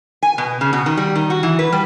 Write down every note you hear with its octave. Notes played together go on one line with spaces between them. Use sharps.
G#5
B2
C#3
B2
D#3
G3
D#3
F#4
E3
B4
G3